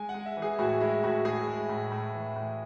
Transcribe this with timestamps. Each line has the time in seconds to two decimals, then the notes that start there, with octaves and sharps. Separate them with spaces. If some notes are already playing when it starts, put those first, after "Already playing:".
Already playing: G#3 G#5
0.09 F#5
0.14 G#3
0.26 E5
0.37 E3
0.42 G#4
0.59 A2 F#4
0.80 G#3 E4
1.03 A2 F#4
1.25 A2 G#4
1.47 G#3
1.69 A2
1.92 A2
2.14 E3
2.36 A2